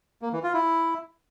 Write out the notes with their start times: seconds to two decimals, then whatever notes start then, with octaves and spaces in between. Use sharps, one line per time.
0.22 A#3
0.33 E3
0.43 F4
0.54 E4